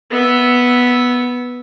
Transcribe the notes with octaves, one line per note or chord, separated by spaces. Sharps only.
B3 E5